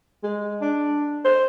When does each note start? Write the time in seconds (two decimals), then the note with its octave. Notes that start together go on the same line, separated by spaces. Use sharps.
0.23 G#3
0.61 D4
1.25 C5